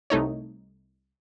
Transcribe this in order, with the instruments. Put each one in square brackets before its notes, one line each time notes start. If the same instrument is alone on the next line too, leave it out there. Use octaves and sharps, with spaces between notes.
[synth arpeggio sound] C2 A3 D#4 C#5